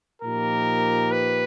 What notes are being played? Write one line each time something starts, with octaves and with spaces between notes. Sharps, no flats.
A#2 F3 A#3 D#4 G4 A#4
B4